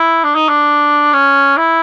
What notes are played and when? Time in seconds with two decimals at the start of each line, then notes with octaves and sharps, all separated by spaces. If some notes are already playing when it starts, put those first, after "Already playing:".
Already playing: E4
0.24 D4
0.35 D#4
0.49 D4
1.13 C#4
1.57 E4